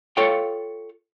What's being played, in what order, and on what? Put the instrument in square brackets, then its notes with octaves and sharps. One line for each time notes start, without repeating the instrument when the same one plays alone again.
[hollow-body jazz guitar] F4 A4 C#5 F5 G5